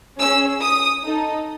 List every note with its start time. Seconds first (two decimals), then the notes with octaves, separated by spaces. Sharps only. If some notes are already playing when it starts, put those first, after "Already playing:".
0.19 C#4 G#4 E6
0.61 D#6
1.03 D#4 A4